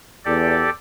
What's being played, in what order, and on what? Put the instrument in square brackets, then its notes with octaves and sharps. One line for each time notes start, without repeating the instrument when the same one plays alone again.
[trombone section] E2 [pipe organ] G4 A4 D5